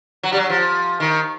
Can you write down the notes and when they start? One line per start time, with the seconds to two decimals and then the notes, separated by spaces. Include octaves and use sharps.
0.23 F#3
0.32 G3
0.36 F#3
0.50 F3
1.00 D#3